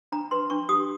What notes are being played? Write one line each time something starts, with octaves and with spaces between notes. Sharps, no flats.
D4 A#5
B4 C6
D4 C#6
G4 D#6